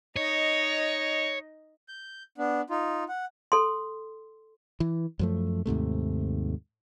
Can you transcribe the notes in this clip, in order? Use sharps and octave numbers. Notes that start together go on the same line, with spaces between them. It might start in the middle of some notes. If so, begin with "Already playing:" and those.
D#4 C#5 D#5
G6
B3 D4
D#4 F4
F#5
A4 C6
E3
F#2 F3 A3
D#2 G#2 C3 A3